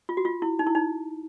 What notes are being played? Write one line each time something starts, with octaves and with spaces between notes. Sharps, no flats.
F4
F#4
F4
E4
D#4
E4
D#4